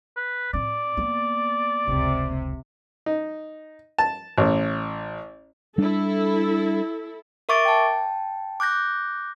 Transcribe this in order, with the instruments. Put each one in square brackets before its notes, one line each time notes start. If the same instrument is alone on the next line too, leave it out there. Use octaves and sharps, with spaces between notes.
[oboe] B4
[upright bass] A2 C4 [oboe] D5
[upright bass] A#3 B3
[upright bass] F1 C#2 [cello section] C3
[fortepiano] D#4
A5
A1
[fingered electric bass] G3 D4 [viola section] E4 A4
[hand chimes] A#4 E5 C#6 D6 A6 D7
G5 A5
D6 F#6 G6 A#6